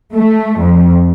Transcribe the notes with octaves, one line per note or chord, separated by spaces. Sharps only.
A3
F2